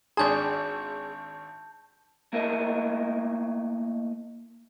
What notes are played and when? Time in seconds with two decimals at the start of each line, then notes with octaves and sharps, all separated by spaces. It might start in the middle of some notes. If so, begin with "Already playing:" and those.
0.17 G#1 D4 G#4 A5 C6 G6
2.33 A3 A#3 E4 A#4 D#5 E5